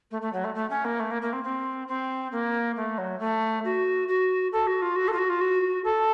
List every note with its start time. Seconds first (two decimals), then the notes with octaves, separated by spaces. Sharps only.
0.11 A3
0.21 A3
0.33 F#3
0.44 A3
0.55 A3
0.70 C#4
0.84 A#3
0.99 A3
1.11 A#3
1.22 A#3
1.33 C4
1.44 C4
1.88 C4
2.32 A#3
2.76 A3
2.98 F#3
3.19 A3
3.64 F#4
4.08 F#4
4.52 A4
4.67 F#4
4.82 F4
4.95 F#4
5.08 A4
5.12 F4
5.18 F#4
5.29 F4
5.41 F#4
5.84 A4